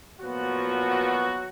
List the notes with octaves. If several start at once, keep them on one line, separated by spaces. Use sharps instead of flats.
A#2 F3 F#3 B3 F#4